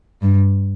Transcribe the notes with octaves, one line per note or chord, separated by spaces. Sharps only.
G2